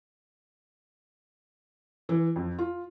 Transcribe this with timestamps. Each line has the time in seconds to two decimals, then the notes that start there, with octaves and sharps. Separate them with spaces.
2.09 E3
2.36 F2
2.58 F4